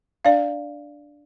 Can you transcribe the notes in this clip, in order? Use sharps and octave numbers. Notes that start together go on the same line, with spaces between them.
D4 D5 F5